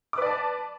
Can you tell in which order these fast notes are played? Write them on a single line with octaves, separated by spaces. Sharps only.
D6 B4 D5 A5